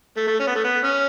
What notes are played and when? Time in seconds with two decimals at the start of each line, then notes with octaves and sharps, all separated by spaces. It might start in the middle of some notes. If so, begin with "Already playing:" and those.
0.17 A3
0.27 A3
0.40 C#4
0.47 B3
0.55 A3
0.64 B3
0.84 C#4